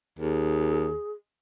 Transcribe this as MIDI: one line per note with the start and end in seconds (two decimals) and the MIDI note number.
0.19 0.94 39
0.19 1.11 68